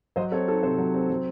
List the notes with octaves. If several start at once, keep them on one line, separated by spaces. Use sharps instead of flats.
F#3 C5 D#5
C4 A4 C#5
D#4 A4
C3 C5
F#3
C4
F#3